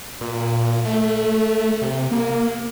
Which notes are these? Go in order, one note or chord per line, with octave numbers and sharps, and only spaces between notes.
A#2
A3
C3
A#3